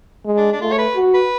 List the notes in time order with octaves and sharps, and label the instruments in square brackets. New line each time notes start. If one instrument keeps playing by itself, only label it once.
[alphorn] G#3
[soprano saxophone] D4
D4
[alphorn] A3 [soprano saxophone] F4
[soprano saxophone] C#5
B4
[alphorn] F#4
[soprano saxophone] B4